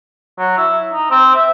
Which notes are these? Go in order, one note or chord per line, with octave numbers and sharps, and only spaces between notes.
F#3
E4
D#4
C4
E5